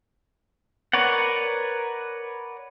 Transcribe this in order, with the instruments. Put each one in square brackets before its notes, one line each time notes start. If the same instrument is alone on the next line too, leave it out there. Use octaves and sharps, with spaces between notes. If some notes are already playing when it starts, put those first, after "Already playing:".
[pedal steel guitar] A#4 B4 C#5 D5 F#5